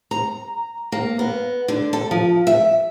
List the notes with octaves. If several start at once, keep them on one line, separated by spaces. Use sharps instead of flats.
A#5
A#3
B3
D3
A4
F3
E5